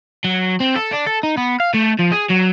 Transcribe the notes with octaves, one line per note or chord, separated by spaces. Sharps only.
F#3
C4
A4
D4
A4
D#4
B3
F5
A3
F3
G#4
F#3